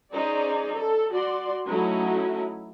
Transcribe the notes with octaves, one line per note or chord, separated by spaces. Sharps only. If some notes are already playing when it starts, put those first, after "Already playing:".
C#4 D#4 G#4 C5 D5
A4
F#4 D5 C6
F#3 A3 C#4 D#4 E4 F#4